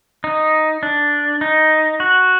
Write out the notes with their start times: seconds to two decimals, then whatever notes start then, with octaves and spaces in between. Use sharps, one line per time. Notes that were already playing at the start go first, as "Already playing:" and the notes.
0.24 D#4
0.83 D4
1.41 D#4
2.00 F#4